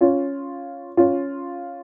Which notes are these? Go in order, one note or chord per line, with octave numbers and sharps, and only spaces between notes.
C#4 F4
C#4 F4